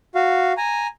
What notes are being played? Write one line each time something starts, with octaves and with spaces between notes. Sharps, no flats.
F#4 F5
G#5 A#5